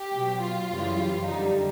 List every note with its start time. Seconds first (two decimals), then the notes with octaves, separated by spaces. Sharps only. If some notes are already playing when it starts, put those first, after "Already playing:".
Already playing: G4
0.14 B2 F#3
0.41 F4
0.70 F#2 C#3 E3 G3
1.27 F2 D3 G3 D#4